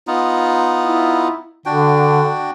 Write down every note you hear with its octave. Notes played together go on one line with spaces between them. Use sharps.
B3 D#4 F4
E4
D3 D4 F#4 G5